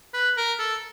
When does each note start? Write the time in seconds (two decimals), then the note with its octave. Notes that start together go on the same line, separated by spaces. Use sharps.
0.14 B4
0.37 A#4
0.59 A4